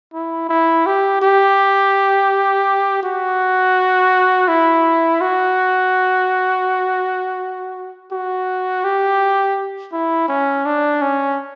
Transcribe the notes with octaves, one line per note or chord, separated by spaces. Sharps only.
E4
E4
G4
G4
F#4
E4
F#4
F#4
G4
E4
C#4
D4
C#4